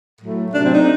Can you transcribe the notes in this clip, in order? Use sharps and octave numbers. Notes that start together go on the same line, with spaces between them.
A2 F#3 A3
C3 F#3 A3 D4
C4
D#4